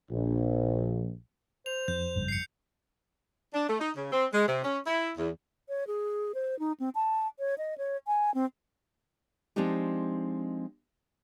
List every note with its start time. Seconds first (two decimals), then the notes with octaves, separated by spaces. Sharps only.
0.11 A#1
1.66 C5 F7
1.88 F2 G6
2.15 G#1 G2 C#3
2.28 C7 C#7
3.53 D4
3.68 A3
3.80 D#4
3.96 C#3
4.12 C4
4.33 G#3
4.48 C3
4.64 C#4
4.86 E4
5.18 E2
5.69 C#5
5.87 G#4
6.34 C5
6.59 D#4
6.80 C4
6.95 A5
7.39 C#5
7.58 D#5
7.78 C#5
8.07 G#5
8.34 C4
9.56 F3 G#3 C4 D4 D#4 G4